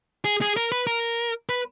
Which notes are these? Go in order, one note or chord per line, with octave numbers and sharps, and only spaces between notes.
G#4
G#4
A#4
B4
A#4
B4